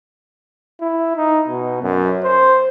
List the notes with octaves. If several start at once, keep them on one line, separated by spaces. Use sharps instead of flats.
E4
D#4
B2
F#2
C5